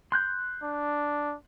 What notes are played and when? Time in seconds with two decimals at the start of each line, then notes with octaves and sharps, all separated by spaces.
0.12 C6 F#6 G6
0.63 D4